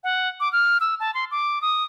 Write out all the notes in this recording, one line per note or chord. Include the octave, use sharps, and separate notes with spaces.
F#5
D6
F6
E6
A5
C6
D6
D#6